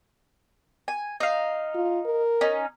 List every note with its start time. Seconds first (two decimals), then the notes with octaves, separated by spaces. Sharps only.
0.88 G#5
1.20 D#4 F5
1.75 F4
2.05 A#4
2.41 C#4 D#4